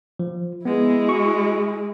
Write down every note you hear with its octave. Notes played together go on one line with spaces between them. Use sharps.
F3
G#3 B3 E4
F#4 C#6